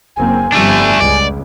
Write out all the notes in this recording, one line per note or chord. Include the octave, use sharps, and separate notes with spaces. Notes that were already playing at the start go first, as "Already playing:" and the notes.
F#1 A#3 C4 G#5
G1 F2 G3 A3 D4
C#2 D5